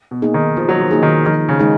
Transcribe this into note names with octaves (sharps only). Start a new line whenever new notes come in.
B2
A#3 D#4 G#4
D#3
D#3 F3
F#3
F3
A#3 D#4 G#4
D#3
D#3 F3
C#3
G#3 D#4 G#4